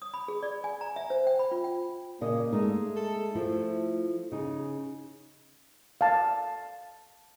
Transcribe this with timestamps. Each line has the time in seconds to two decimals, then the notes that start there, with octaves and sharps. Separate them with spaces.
0.02 D#6
0.14 B5
0.28 G#4
0.43 D5
0.64 G#5
0.81 A#5
0.96 E5
1.10 C5
1.27 G5
1.39 B5
1.52 F4
1.64 G5
2.21 A#2 C#3 A#3 D#5
2.52 G#3 A3 D#4
2.96 A4
3.35 F3 A3 E4 F4
4.32 C#3 D#4
6.01 F5 A5